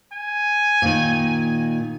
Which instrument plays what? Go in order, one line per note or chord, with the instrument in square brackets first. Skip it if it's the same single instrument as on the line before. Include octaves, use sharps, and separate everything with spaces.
[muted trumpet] G#5
[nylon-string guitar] A#2 D#3